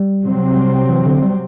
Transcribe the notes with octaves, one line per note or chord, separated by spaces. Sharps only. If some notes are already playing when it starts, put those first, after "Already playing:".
Already playing: G3
C3 F#3 C4
G3
E3
D3
G3